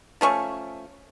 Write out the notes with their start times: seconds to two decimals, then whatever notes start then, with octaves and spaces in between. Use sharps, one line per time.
0.21 F3 A3 C#4 C#6